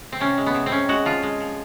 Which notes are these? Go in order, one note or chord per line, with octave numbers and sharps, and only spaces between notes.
C4
C3 C#4
G#3
B3
C3
C4
C3 C#4
G#3 F#4
F3 F4
G#3
F3